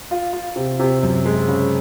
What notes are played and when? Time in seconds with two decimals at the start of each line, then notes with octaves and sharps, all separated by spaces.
0.11 F4
0.33 F4
0.56 C3
0.79 C3
1.03 F#2
1.25 G#3
1.48 C#3